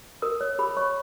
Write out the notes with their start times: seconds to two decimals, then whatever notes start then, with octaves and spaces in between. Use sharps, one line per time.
0.22 A#4 D#6
0.41 C#5
0.59 G#4 B5
0.77 C#5 C#6